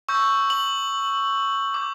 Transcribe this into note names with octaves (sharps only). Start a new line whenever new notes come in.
C#6 E6 G6
F#7
D6 G6